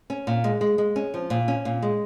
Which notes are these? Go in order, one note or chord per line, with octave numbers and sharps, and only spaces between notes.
C#4
A#2
G#3
G#3
G#3
C#4
F3
A#2
C#4
A#2
G#3